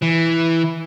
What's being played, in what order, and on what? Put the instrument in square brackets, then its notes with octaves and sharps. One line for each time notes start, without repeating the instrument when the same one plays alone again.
[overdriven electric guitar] E3